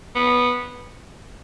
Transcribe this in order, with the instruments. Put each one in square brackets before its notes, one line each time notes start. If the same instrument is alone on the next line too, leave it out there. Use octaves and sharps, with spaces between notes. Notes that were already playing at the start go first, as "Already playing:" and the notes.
[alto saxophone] B3